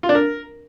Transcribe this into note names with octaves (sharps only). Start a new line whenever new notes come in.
F4
D4
A#4